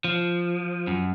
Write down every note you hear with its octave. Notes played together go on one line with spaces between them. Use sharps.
F3
F#2